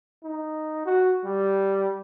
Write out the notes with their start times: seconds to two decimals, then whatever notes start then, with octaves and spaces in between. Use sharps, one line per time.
0.24 D#4
0.86 F#4
1.24 G3